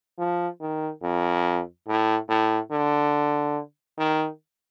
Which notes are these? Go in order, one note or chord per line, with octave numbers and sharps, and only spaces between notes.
F3
D#3
F2
A2
A2
D3
D#3